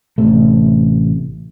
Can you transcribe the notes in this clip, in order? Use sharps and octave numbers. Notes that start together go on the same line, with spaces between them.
A1 C3 A3